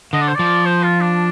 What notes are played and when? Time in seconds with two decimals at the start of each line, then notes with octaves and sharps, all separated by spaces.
0.13 D3 D#5
0.21 D5
0.28 C5
0.35 F3 D5
0.66 C5
0.83 F4
1.00 D4